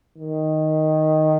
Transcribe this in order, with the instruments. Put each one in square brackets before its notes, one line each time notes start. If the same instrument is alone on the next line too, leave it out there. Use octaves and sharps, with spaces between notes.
[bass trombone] D#3